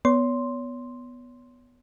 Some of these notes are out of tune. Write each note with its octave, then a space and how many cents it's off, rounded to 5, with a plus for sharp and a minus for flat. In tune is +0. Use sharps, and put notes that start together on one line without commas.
B3 +0 C#5 +30 C6 +0